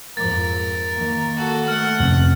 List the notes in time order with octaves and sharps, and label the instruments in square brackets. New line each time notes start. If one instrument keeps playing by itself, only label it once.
[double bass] F2 G#2 [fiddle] A#4 [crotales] A6
[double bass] D#3 A#3
[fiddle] F#4 A4
[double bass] A3 [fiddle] F#5 [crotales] F6
[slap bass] F2 C3 C#4 [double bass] E3